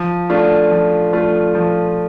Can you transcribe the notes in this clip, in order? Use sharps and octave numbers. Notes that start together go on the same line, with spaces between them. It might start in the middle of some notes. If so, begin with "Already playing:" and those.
Already playing: F3
A3 D4 F4
F3
A3 D4 F4
F3